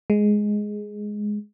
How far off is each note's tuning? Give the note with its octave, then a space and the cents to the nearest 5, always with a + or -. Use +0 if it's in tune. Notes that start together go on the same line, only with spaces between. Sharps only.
G#3 +5